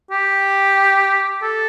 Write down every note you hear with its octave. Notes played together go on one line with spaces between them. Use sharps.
G4
A4